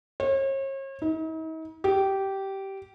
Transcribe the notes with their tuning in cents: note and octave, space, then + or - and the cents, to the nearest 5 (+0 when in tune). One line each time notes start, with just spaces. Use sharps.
C#5 -40
D#4 +45
G4 -15